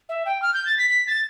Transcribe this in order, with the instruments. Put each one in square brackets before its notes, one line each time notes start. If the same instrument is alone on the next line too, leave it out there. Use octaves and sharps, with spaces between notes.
[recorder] E5
G5
F6
G6
A6
B6
B6
A6